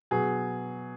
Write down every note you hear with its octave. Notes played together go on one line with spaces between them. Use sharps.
B2 F#3 G#4